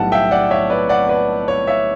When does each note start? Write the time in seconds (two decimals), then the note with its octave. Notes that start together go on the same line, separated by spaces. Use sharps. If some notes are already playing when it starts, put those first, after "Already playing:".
Already playing: B1 A2 G3 B3 F#5 A5
0.12 E5 G5
0.31 D5 F#5
0.51 C#5 E5
0.70 B4 D5
0.89 D5 F#5
1.09 B4 D5
1.48 C#5
1.67 C#5 E5